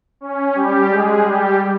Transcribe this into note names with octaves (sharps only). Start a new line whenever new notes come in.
C#4
G3 G4
G#3 G#4
G3 G4